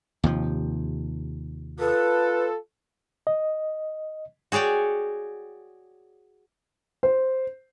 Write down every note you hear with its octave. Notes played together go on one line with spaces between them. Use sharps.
D#2 C3 F3
F4 A4 B4
D#5
F#4 G#4 C#5 D5 G5
C5